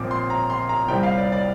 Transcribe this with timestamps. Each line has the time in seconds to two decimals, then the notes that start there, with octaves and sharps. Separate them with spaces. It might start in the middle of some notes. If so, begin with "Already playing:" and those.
Already playing: A#1 A#2 F3 C4 D6
0.11 C6
0.30 A#5
0.50 C6
0.69 A#5
0.88 C2 C3 G3 C4 G5
1.03 F5
1.18 D5
1.32 D5